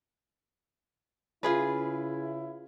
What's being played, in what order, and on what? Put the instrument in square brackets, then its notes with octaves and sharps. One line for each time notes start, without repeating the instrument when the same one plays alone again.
[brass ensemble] C#3 C#4 E4 [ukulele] F4 G#4 B4